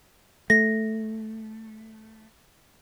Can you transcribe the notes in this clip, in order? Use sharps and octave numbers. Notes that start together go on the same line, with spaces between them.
A3 A#6